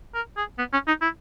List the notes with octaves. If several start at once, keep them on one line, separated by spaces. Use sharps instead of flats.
A#4
G#4
B3
C#4
D#4
E4